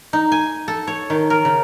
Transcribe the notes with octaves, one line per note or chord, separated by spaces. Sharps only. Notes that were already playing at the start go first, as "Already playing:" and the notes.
D#4
G#5
A4
C#5
D#3
A#4
C#3